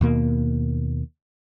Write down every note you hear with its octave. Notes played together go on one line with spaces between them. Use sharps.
D#2 B2 A#3